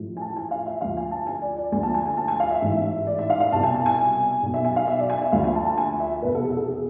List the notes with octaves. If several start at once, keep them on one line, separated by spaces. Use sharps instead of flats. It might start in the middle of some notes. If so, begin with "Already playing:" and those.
Already playing: A1 A2 F3
G#5
A5
G#5
F5
E5
D2 D3 F3 F5
G#5
A5
G#5
D5
D5
D2 D3 F3 G#5
A5
G#5
G#5
A5
G#5
F5
E5
A1 G#2 E3
D5
E5
F5
F5
C2 B2 A5
G#5
A5
G#5
B1 B2
E5
G#5
F5
E5
D5
G#5
E5
D2 D3 F3 F5
G#5
A5
A5
G#5
E5
F1 E2 B2 B4
A4
G#4
A4
G#4